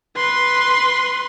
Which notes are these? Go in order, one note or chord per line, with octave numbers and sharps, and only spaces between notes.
B4 C6